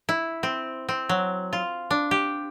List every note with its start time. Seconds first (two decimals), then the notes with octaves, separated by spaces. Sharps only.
0.09 E4
0.43 C4
0.89 C4
1.09 F#3
1.53 F4
1.91 D4
2.11 G4